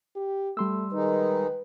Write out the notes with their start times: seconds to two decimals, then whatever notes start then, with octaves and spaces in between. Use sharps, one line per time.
0.16 G4
0.57 G3 A3 C6 E6
0.93 D#3 G#3 D#4 B4